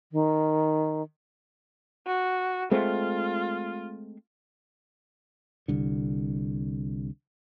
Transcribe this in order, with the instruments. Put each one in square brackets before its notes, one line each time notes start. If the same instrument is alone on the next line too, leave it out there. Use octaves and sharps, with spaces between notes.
[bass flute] D#3
[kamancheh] F#4
[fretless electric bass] G#3 A3 C4 [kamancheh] F4
[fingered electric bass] C2 D3